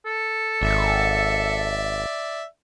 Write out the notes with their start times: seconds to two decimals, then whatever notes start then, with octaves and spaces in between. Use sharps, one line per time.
0.05 A4
0.61 G#1 D5 E5